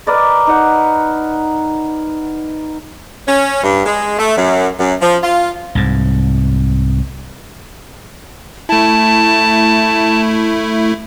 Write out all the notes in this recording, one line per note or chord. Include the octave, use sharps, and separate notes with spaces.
A#4 B4 D5 D#5
D#4 F#5
C#4
G2
G#3
A3
F#2
F#2
F3
F4
C2 G#2
A3 E4 A5